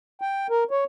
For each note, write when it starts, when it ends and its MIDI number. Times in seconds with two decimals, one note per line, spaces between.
0.21 0.47 79
0.50 0.64 70
0.71 0.84 73